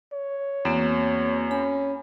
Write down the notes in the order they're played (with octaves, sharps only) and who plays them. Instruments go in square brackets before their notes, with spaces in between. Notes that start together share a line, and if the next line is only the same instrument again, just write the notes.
[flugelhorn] C#5
[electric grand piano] E2 [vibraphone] A#3 C4 F#4
[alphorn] C#4 [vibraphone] B5